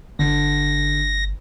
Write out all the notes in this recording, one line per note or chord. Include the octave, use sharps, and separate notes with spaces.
G1 D3 A#6